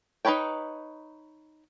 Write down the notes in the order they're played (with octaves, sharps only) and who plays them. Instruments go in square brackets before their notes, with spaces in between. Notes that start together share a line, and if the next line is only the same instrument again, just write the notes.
[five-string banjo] D#4 F4 B4 C#5 G5